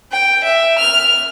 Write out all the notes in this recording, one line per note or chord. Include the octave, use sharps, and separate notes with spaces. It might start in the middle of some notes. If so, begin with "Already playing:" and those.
G5
E5
F6